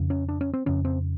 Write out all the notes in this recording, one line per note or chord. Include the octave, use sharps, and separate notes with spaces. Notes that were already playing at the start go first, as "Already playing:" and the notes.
Already playing: F2 C#3
C#4
D4
C#4
C4
F2 C#3 C#4
C4